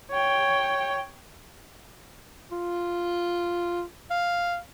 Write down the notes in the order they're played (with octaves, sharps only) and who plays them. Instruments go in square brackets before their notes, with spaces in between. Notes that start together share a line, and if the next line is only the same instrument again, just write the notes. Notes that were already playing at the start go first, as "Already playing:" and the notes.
[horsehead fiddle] C#5 G5
[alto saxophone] F4
F5